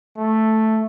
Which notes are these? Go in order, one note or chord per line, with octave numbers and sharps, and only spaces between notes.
A3